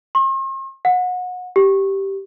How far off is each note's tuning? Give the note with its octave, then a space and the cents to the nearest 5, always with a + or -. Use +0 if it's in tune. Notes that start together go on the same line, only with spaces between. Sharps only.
C6 +45
F#5 -30
G4 -5